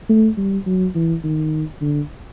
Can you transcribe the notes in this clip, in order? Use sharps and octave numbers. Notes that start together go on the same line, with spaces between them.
A3
G3
F#3
E3
D#3
D3